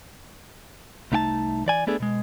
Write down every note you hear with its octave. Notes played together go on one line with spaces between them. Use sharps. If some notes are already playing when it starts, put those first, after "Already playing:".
C2 A3 D#4 G5 A5
E3 D5 G#5
A3 B3 D4 G#4 A4
B2 G#3